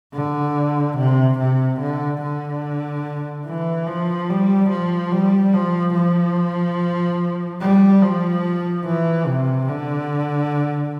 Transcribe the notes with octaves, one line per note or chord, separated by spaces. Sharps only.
D3
C3
C3
D3
D3
E3
F3
G3
F3
G3
F3
F3
G3
F3
E3
C3
D3